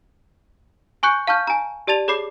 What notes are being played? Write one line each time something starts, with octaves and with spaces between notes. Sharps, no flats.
G#5 C#6 F#6 G6 C#7
F5 A5 C#6 F6 G6
G#5 A#5
G4 D5 A5 A6 F7
G#4 C#5 B5 D6 C7